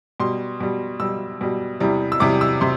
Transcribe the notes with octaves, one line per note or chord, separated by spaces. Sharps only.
B2 G3 C6
B2 G3
B2 G3 E6
B2 G3
E2 C3 G3
E6
E2 C3 G3 D6
E6
C3 C6